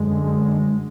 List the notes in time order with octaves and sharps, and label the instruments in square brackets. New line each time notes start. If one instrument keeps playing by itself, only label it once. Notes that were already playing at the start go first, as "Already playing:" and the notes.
Already playing: [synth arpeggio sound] F#2 D3 G#3